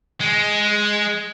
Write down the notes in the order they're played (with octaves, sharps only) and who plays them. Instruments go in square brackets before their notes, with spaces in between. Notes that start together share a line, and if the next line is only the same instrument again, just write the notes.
[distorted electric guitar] G#3